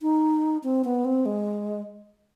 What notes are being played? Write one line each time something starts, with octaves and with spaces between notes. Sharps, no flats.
D#4
C4
B3
C4
G#3